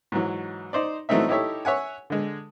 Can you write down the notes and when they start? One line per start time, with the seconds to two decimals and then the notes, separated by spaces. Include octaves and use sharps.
0.12 G#2 E3 F#3
0.73 D#4 C5 D5
1.09 E3 F#3 A3 C4 D#4 E5
1.28 D#4 E4 G4 A4 C#5 E5
1.65 C#5 E5 F#5 G#5
2.10 D3 G#3